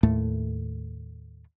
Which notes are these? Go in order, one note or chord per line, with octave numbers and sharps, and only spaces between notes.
D#2 A2 A3